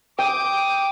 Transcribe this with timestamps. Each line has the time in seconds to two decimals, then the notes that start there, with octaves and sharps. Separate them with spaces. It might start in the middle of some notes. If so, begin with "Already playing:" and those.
0.19 G5 D6 D#6